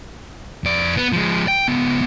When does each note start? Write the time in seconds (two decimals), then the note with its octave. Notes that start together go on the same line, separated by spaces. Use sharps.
0.64 F2 D5
0.97 B3
1.13 F3 G#3
1.48 G5
1.68 C#2 B3